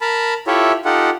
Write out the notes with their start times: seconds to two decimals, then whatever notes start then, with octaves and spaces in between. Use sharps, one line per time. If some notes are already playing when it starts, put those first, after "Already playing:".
0.01 A#4 A5 B5
0.47 E4 F4 G4 A4 C#5 E5
0.85 D#4 F4 G4 A4 F#5